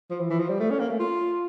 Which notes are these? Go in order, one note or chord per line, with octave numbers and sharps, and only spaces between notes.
F3
E3
E3
F3
G3
A3
C#4
A#3
A3
F4